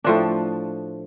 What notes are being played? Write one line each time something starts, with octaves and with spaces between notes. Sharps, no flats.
A2 F3 D4